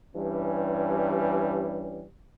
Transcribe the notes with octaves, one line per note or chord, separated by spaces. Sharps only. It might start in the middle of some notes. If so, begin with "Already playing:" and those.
G2 E3 G3 C#4